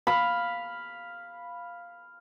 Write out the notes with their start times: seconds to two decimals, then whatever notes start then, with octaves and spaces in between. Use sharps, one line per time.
0.07 F5 B5